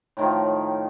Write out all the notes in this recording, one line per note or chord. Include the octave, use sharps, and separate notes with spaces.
A2 D#3 F3